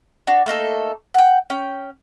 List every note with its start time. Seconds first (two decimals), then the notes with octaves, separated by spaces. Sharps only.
0.27 D4 F#4
0.46 A3 A#3 D#4 A4
1.14 F#5 G5
1.50 C#4 G5